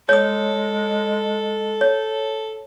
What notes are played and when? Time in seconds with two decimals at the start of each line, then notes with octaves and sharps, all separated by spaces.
0.09 G#3 A4 C#5 D#6
1.81 C#5